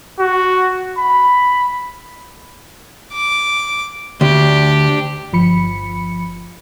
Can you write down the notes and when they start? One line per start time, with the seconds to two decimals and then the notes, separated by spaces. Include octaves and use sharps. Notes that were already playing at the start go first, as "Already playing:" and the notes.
0.20 F#4
0.98 B5
3.13 D6
4.21 D2 D4 G4
5.33 G1 F3 B5 C#7